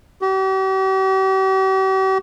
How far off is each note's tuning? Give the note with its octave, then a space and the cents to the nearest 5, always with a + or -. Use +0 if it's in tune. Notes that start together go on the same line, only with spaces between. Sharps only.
G4 -45